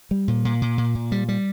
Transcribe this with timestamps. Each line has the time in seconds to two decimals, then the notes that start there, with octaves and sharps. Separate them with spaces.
0.11 G3
0.28 A#2
0.45 A#2
0.62 A#2
0.78 A#2
0.95 A#2
1.12 G3
1.29 G3